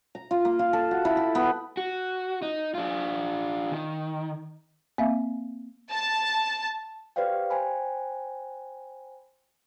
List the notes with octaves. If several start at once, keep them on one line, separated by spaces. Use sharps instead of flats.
A#5
F4
A#3
F4
A4
F#4
E4
G4
B3
F#4
D#4
D4 F4
D#3
A#3 C4 E5 F5
A5
G4 B4 C5 D5 F5 G5
C5 G5 G#5 B5